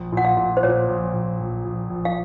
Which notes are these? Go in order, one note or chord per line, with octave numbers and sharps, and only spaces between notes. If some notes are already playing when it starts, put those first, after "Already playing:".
Already playing: A#1
A#2 F#5
F5
A#2
C5
A#2 C#5
A#1
A#1
A#1
A#1
A#1
F5